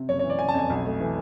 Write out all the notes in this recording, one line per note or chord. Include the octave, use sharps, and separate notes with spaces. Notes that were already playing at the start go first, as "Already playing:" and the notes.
Already playing: C3
F#1 C#5
E3 C#5
D5
C#3 G#5
A5
F2 G#5
B1
A3
E3